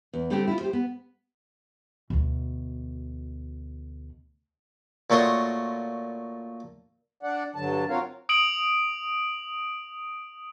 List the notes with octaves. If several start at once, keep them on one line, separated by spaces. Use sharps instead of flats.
E2
D3 G3 A3 C4 G4
E4 F4
G4 C5
B3
D2 B2
A#2 A3 F#4 C#5 C6 D#6
D4 D5 F#5
G2 D3 F#3 A5
C4 F4 F#4 A#4 C#5 F5
D#6 D7 F#7